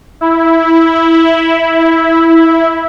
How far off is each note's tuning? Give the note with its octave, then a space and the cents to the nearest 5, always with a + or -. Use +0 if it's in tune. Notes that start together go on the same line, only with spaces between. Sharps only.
E4 -5